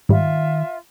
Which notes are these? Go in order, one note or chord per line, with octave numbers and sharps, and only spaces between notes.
G#2 D#3 G3 F4 E5